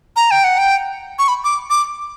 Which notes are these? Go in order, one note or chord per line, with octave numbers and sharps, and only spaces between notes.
A#5
G5
F#5
G5
C#6
B5
D6
D6